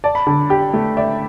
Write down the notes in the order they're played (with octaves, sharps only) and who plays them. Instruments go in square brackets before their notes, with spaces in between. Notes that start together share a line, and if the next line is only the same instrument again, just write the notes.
[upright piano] D5 [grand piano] A5
[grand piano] B5
[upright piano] D3 [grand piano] A5
[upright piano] G4 [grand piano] G5
[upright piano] A3
[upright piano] D5 [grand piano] E5